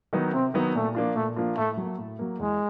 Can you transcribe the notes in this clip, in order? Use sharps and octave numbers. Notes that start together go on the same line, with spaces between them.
D#3 F#3 B3 D#4
C3 C4
D#3 F#3 B3 D#4
A#2 A3
F3 A#3 D4 F4
A#2 A3
F3 A#3 D4 F4
A2 A3
F#3 A#3
A2
F#3 A#3
E2 G#3